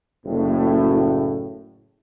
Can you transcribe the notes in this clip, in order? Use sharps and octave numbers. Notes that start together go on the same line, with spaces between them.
F#1 A2